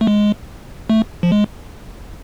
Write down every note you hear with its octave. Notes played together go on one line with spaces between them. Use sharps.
A3
G#3
A3
F3
G#3